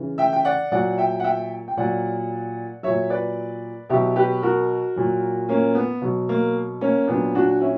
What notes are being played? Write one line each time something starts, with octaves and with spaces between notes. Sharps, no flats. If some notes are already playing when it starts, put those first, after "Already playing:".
Already playing: C#3 E3
E5 G5
G5
D5 F#5
A#2 F#3 D5 F#5
E5 G5
F#5
E5 G5
G5
A#2 F#3 D5 F#5
A#2 F#3 C#5 E5
B4 D5
B2 F#3 E4 G4
G4 B4
F#4 A#4
A#2 F#3
A#3 C#4
B3
B2 F#3
A#3
A#3 C#4
A#2 F#3 B3 D4
D4 F#4
C#4 E4